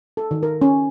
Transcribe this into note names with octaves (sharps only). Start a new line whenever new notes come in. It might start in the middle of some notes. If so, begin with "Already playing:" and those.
A4
D#3
A#4
C#4